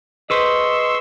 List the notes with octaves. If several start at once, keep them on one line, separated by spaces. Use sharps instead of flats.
G#4 B4 C5 D#5 C6 C#6 E6